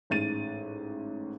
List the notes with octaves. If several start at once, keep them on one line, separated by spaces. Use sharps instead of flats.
A1 G#2 A6 D#7